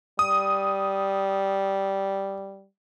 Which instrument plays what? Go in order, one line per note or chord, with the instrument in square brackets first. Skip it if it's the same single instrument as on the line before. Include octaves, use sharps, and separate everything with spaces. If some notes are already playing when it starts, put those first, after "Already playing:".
[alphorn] G3 [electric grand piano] D#6